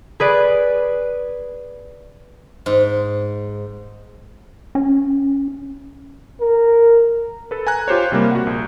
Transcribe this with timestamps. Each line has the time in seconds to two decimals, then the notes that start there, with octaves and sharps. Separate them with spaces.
0.20 G#4 B4 D5
2.66 G#2
4.75 C#4
6.40 A#4
7.51 A4 B4
7.67 G#5 A#5 F#6
7.88 F4 G4 C5 C#5
8.12 C3 G3 A#3
8.31 F#4 F#5
8.47 A#1